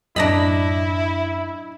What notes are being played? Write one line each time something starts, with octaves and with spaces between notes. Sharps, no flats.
F#2 A2 D4 E4 D#5 A#5 B5 A#6